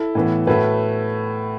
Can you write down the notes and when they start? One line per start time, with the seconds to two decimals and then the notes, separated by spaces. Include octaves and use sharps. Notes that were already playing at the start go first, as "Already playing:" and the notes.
Already playing: E4 A4
0.15 A2 E3 B3
0.47 A2 A3 F#4 B4